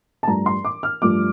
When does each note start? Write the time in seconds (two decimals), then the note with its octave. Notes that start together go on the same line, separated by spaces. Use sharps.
0.23 A5
0.28 G2 F3 A3 A#5
0.46 C6
0.65 D6
0.83 F6
1.02 G2 F3 A3 D6